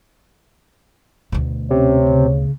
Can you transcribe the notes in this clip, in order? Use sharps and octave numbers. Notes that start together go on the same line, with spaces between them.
D2 B2
C3 C#4 C#5
C#3